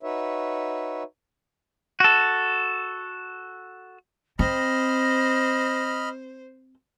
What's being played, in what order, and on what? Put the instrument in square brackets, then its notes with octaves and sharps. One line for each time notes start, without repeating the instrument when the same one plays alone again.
[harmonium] D#4 F#4 B4 C#5 E5
[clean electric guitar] F#4 A4
[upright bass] C4 [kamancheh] C5 [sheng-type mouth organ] D#5 B5 F6 [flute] A#6